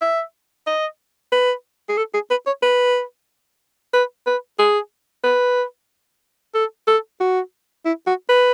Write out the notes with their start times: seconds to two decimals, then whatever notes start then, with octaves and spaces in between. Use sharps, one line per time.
0.02 E5
0.67 D#5
1.32 B4
1.89 G#4
1.97 A4
2.14 G#4
2.31 B4
2.47 C#5
2.63 B4
3.94 B4
4.27 B4
4.59 G#4
5.24 B4
6.55 A4
6.88 A4
7.20 F#4
7.86 E4
8.07 F#4
8.29 B4